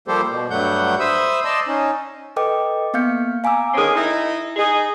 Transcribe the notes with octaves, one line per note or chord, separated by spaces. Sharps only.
F3 G3 A#3 G4 A4 C5
B2
G2 F#3 G3 A3 F#5 G6
C5 E5 B5 D#6 E6
D5 D#5 A5 C6 E6
C#4 D#4
A4 B4 D#5 G5 D6
A#3 B3 F5 F6 G6 C#7
F5 G#5 A#5 D6 E6
D3 D#3 C4 C#4 G#4
D#4 E4
D#4 G#4